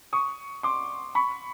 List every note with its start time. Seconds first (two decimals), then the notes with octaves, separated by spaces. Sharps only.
0.13 C#6 D#6
0.63 C6 D6
1.15 B5 C#6